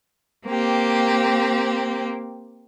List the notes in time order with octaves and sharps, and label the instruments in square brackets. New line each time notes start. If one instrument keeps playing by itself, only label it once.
[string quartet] A#3 C4 G4